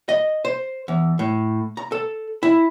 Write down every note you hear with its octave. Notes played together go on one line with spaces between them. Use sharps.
D#5
C5
E2
A2
A#5
A4
E4